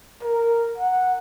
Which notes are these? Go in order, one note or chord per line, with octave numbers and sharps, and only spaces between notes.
A#4
F#5